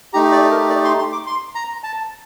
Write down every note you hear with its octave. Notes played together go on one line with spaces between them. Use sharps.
A3 D#4 G4 A#5
D5
A#4
D5
C6
C6
D6
C6
A#5
A5